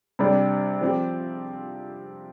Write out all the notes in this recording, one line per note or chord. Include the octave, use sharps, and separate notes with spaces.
C3 G3 D4 G4
F3 C4 G4